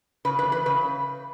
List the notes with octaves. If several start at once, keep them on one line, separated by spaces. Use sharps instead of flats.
C#3 B4
B4
E3
B4
C#3 B4